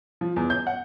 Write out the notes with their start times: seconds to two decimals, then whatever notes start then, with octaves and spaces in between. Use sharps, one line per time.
0.21 F3
0.36 E2
0.50 G6
0.67 F#5